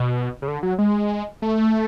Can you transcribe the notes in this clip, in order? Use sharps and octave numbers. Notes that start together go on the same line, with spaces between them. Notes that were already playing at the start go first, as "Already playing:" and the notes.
Already playing: B2
C#3
D3
F#3
G#3
A3